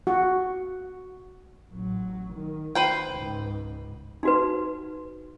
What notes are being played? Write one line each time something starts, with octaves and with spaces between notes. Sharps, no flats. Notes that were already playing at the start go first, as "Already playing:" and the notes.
F#4
A1 F#3
D#3
B4 C5 G5
C#2 G#2
D#4 F#4 B4